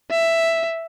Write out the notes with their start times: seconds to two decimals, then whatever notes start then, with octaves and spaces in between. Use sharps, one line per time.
0.11 E5